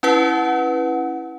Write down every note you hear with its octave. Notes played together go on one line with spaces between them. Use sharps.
C#4 E4 B4 F#5